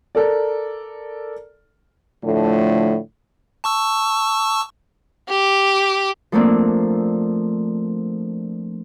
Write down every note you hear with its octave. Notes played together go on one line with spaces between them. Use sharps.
A4 A#4 D5
A2 D3 F3 A3
A5 C#6 E6
G4 D6
F3 A3 A#3 C4 D4